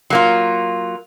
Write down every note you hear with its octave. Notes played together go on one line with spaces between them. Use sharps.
F#3 A#3 F4